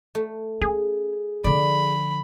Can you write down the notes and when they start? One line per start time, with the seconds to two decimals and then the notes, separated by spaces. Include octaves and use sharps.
0.15 A3
0.61 C#4 G#4
1.44 D3 F3 D5 B5